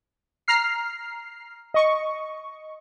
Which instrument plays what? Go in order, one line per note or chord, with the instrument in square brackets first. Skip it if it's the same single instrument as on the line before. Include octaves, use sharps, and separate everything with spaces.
[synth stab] A#5 F6 C7
D#5 C#6